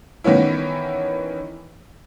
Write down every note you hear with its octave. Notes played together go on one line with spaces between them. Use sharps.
D#3 E3 B3 C#4 E4